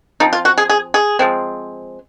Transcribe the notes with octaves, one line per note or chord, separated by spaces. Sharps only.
F3 C4 D#4
F4
F#4
G#4
G#4
G#4
F3 G#3 C4